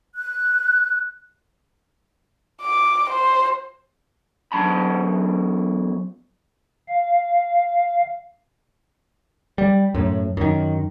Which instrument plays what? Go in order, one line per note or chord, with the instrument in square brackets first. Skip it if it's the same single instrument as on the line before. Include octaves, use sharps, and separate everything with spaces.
[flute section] F#6
[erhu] D6
C5
[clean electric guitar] E2 F#3 A5 B5
[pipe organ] F5
[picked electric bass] G3
F#2 A2
F#2 D#3